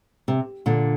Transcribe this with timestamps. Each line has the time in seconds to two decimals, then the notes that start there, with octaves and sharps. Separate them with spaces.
0.28 C3
0.66 A#2 D3